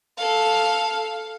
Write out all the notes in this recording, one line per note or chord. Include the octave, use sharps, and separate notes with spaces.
A4 F5